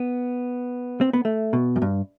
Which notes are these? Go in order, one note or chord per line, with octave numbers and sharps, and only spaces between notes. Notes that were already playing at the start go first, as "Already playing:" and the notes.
Already playing: B3
C4
B3
A3
B2
F#2
G2